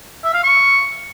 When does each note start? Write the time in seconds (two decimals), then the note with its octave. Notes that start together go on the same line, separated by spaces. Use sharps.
0.24 E5
0.34 F5
0.43 C#6